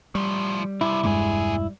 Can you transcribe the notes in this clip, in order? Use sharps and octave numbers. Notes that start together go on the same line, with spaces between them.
A2 F3 G3
G2 C3 E4
E1 G2 A#2 G#3 G#4